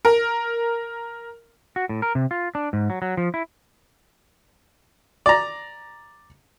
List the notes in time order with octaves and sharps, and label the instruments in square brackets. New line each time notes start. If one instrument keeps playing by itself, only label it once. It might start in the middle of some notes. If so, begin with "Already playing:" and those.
[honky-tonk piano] A#4
[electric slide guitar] F#4
A2
A#4
C3
F4
D4
G#2
F#3
F#3
F3
E4
[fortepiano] D5 A#5